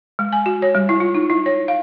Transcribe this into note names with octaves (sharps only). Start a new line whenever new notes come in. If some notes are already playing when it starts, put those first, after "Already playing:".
G#3
G#5
F#4
C#5
G3
E4
F4
D#4
E4
C#5
F5